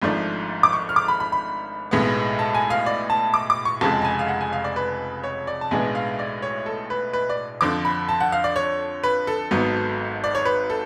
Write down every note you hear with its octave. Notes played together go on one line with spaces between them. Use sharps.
G#1 G#2 F3 A3 D4
D6
C#6
F6
D6
B5
B5
B5
B1 A2 G#3 B3
A5
G#5
F5
D5
A5
D6
D6
C#6
F1 F2 C#3 G#3 A5
A5
G#5
F5
F#5
G#5
F5
D5
B4
C#5
D5
A5
B1 A2 G#3 B3 D4 G#5
F5
D5
C#5
A4
B4
B4
D5
F2 D3 F3 D6
B5
A5
F#5
F5
D5
C#5
B4
A4
G#1 G#2 F#3 B3
D5
C#5
B4
A4